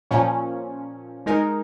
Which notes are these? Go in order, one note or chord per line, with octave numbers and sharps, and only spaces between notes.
A#2 F3 C#4
G#3 D#4 A#4